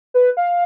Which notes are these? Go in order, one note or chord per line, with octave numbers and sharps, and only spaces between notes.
B4
F5